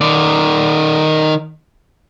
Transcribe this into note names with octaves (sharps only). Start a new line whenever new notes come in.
D#3 D5